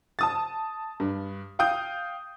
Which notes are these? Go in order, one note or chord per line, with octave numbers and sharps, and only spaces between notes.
A5 D#6 A6
G2
F5 G5 D#6 G6